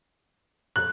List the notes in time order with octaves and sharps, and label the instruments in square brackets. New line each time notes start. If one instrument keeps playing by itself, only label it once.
[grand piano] F#6